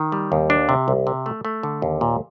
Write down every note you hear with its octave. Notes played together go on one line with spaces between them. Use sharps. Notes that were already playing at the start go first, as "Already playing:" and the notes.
Already playing: D#3
G3
D#2
D4
C3
C2
C3
A3
A3
D3
D#2
A#2